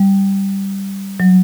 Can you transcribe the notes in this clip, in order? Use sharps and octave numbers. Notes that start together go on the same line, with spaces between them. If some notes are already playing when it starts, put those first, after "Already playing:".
Already playing: G3
F#3